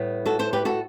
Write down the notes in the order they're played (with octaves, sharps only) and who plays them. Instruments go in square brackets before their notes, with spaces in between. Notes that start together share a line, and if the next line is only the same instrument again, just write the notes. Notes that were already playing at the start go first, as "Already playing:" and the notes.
Already playing: [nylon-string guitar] A2 G3 B3
F#4 A4
A4 C5
G4 B4
F#4 A4